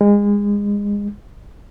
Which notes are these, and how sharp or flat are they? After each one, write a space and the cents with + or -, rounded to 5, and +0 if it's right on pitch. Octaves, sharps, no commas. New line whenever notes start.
G#3 -25